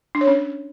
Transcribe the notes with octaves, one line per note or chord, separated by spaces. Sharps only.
D4
C#5
C#4